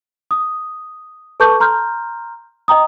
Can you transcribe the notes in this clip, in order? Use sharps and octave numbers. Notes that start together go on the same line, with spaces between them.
D#6
A4 B4 A5 C#6 D6 G6
A#5 C6 F6 G6
D#5 G5 A#5 D#6